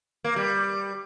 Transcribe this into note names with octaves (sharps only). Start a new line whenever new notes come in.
A#3
G3